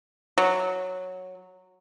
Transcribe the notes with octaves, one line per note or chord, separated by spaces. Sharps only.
F#3